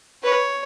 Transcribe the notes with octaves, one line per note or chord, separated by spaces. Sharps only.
B4 C#5